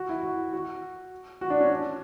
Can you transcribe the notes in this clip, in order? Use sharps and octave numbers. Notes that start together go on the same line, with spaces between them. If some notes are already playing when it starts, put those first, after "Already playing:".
Already playing: F#4
E4
F#4
F#4
F#4
D4
C#4
D4